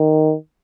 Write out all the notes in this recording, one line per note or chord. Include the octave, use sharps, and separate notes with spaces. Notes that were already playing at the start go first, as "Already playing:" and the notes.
Already playing: D#3